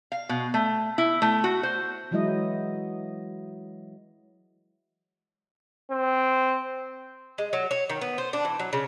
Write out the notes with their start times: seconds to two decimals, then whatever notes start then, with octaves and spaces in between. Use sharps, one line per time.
0.12 F5
0.29 B2
0.54 A3
0.98 E4
1.22 A3
1.44 F#4
1.63 C5
2.11 E3 F#3 G#3 E4 D#5
5.91 C4
7.38 G#3
7.53 F#3
7.71 C#5
7.89 D#3
8.01 B3
8.18 C5
8.33 D4
8.45 E3
8.60 F#3
8.73 C#3